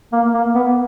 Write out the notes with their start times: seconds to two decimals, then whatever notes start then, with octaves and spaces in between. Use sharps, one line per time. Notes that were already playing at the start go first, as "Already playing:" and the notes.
0.13 A#3
0.34 A#3
0.55 B3